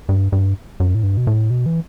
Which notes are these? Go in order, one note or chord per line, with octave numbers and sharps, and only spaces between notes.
G2
G2
F#2
A2
G2
B2
A2
B2
E3